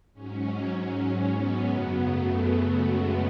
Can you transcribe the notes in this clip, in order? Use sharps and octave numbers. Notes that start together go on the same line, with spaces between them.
G#2 F#3 C#4
B3
F#2 C#3 F#3
A3
G#3